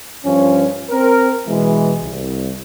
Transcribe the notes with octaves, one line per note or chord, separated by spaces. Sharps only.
G2 F3 C#4
C4 A#4
B2 E3 G#3
C2